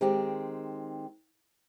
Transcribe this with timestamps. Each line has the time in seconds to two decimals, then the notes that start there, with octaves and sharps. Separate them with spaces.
0.01 D#3 G#3 C4 G4